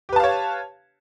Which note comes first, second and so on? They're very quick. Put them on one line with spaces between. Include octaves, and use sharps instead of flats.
G4 B4 A5 F5 C#5